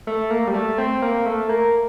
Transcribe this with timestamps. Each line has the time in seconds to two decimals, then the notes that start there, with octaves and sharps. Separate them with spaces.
0.07 A3
0.31 A#3
0.48 G3
0.54 A3
0.78 C4
1.02 A#3
1.26 A3
1.49 A#3